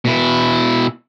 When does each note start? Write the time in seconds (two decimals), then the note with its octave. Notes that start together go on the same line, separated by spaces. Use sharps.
0.05 B2 E4